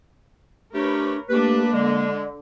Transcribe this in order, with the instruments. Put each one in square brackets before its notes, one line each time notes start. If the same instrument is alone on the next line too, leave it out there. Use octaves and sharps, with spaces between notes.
[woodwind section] A3 G4 [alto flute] D4 [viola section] A#4 B4 C#5
[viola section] A3 D4 [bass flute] A#3 [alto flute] G4 [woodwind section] B4
[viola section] D3 [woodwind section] G#3 [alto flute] D5